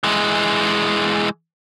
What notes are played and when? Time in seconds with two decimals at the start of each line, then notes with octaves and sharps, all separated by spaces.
0.04 E3 G#3